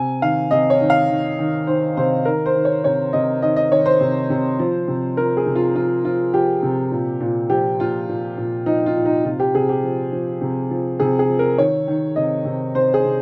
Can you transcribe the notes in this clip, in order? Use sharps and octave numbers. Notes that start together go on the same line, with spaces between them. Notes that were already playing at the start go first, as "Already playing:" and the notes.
Already playing: C3 G#5
D#3 F5
C3 D#5
C#5
D#3
F5
D#3
D#3
D#3 C5
C3 C5
D#3 A#4
C5
D#3
C#5
C3 C#5
C3 D#5
D#3 D#5
D#5
D#3 C#5
C5
C3
C3
F3
C3
F3 A#4
G#4
C3
F4
F3 F4
F3 F4
F3 G4
C3
A#2
A#2
F3 G4
A#2 F4
A#2
A#2
F3 D#4
F4
A#2
D#4
C3 F4
G4
C3 G#4
G4
F3
F3
C3
F3
C3 G#4
G#4
F3
A#4
D#3 C#5
D#3
C3 D#5
C3
C3 C5
G#4
C3